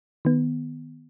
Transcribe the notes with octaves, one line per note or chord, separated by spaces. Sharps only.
D#3 B3